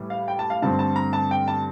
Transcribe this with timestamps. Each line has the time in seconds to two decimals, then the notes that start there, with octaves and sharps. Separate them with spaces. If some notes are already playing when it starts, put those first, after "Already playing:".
Already playing: A2 E3 G3
0.10 F5
0.28 G5
0.39 A5
0.50 F5
0.62 G2 D3 A3 C4 A5
0.79 A5
0.96 A#5
1.13 A5
1.31 G5
1.48 A5